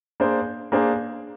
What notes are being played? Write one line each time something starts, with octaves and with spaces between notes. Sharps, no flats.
A#3 D4 G#4 C5
A#3 D4 G#4 C5